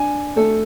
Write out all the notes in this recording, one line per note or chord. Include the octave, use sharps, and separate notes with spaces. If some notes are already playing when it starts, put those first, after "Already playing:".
Already playing: D4 G#5
A3 A4